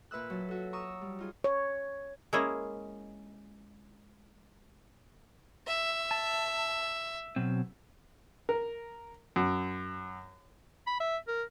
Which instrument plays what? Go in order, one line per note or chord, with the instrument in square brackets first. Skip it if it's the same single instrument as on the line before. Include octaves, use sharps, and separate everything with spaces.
[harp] A#2 B4 E5 E6 F#6
F#3 A5
F#4 A4
A#5 C#6 D#6 E6
G3
D#4 F4 G#4
[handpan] C#5
[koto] G#3 A#3 C#4 E4 C#5 D#5
[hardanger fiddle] E5
[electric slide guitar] A5
B2 F#3 C4
[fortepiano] A#4
F#2
[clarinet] B5
E5
A#4